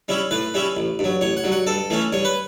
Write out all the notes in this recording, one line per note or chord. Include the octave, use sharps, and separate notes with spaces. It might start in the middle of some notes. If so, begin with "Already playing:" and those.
G3 C#4 E4
A2 B4
G3 C#4 E4
A1
G2 F#3
A1 C#5
F#5
G2 F#3
F#5
G2 A4
E3 A3 C#4
G2 C#5
B4